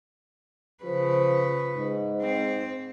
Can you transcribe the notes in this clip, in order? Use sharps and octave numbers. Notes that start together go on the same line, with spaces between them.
C#3 F3 B4
G#2
C4